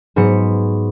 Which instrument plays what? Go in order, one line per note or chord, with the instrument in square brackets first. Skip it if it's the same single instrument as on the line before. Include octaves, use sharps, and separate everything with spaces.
[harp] G#2 F#3 B3 C#7